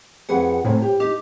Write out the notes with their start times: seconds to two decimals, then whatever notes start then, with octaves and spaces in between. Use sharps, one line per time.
0.29 F2 G#4 B4 F#5
0.65 A2 C3 A3 G#5
0.82 G4
1.00 D#4 G4